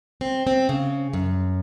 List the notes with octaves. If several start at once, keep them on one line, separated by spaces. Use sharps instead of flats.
C4
C4
C#3
F#2